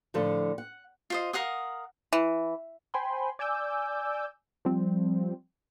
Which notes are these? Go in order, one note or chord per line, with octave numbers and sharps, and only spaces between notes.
A2 D3 F3 A4
F#5
F4 C5 D#5
A#4 F5 F#5 D#6
E3
C5 G5 G#5 B5 C6
D5 G#5 D6 E6 G6
F3 G3 C4